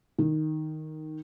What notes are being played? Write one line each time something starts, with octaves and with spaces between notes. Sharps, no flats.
D#3